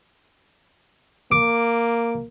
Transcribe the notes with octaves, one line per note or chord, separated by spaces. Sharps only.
A#3 D6